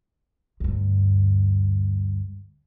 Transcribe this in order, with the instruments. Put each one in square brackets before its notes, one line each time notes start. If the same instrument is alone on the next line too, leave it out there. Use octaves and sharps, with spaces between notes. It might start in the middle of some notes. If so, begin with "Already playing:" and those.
[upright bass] D2 G2